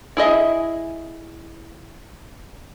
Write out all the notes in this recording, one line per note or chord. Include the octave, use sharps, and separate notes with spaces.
E4 G#4 D#5 E5